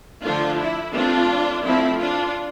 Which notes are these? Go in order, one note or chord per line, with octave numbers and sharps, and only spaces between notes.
D3 F3 A3 D4 F4
E4
F3 A3 C4 D4 F4
F3 A3 C4 E4
D4 F4